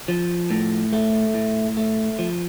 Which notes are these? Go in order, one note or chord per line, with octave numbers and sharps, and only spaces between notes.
F3
A2
A3
A2
A3
F3